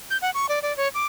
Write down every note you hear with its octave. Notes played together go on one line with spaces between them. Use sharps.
G6
F#5
C#6
D5
D5
C#5
D6